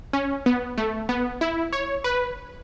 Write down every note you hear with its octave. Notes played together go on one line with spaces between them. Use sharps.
C#4
B3
A3
B3
E4
C#5
B4